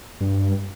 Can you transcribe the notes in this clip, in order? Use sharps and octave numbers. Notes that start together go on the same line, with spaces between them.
G2